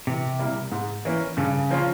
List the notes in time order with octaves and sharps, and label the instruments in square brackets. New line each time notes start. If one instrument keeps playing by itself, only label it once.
[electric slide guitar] C3 [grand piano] E3
[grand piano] G3 A#3 E4
G#2
E3 A#3 C#4
[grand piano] G2 [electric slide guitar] C#3
[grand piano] F3 A#3 C#4 F4